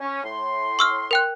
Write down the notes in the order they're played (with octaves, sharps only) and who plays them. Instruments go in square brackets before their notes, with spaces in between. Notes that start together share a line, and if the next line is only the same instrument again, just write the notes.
[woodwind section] C#4
A2 C6
[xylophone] C#6 E6 F6
A#4 G5 F#6